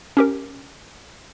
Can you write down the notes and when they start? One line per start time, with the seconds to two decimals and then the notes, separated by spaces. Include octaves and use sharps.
0.17 C#4 G4 A#4